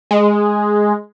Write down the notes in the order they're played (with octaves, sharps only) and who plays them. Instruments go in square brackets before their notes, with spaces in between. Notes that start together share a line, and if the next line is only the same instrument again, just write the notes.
[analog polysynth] G#3